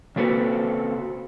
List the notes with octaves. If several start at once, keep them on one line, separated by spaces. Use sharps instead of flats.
C#3 A#3 C4 F#4 A4 B4